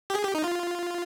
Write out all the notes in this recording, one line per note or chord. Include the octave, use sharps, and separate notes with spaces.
G4
G#4
G4
D#4
F4